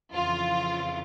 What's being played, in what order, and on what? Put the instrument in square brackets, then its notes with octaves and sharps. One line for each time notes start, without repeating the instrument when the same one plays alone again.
[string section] F2 C#3 E3 F4